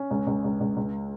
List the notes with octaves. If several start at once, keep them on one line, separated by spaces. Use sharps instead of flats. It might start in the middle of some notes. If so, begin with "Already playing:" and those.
Already playing: C#4
C#2
C#2
C#2
C#2
C#2